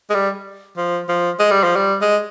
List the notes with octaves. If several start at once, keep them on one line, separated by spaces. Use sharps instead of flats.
G#3
G3
F3
F3
G#3
G3
F3
G3
G#3